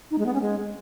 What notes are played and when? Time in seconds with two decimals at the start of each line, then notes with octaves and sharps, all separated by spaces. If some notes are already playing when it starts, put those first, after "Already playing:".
0.11 D#4
0.18 G#3
0.26 B3
0.34 C#4
0.41 G#3